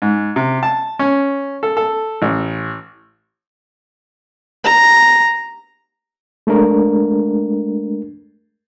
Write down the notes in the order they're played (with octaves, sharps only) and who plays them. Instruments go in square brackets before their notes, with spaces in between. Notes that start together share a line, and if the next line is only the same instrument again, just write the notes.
[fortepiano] G#2
C3
A5
C#4
A4
A4
A1
[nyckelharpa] A#5
[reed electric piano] G#3 A3 D4 A#4